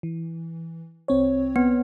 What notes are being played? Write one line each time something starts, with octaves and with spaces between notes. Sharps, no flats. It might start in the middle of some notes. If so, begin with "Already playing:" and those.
E3
C2 C4 C#5
B3